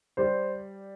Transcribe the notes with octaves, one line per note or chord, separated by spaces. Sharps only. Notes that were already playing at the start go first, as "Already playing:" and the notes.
G3 C5